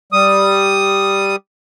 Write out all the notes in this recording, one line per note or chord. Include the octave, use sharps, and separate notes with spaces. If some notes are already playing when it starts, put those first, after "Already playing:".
G3 D#6